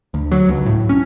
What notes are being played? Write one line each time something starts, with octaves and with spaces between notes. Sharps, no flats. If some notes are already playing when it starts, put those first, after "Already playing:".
D2
F#3
C#2
A2
C#4